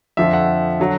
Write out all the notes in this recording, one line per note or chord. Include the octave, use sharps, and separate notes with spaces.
F2 D3 F3 E5
F#5
D3 F#3